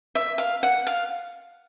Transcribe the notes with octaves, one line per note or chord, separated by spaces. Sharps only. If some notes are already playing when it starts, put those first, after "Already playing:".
E5
F5
F#5
F5